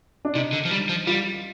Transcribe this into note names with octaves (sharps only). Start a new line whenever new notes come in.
D4
C3 D#4
D3
F3
G3
F3
G3 F4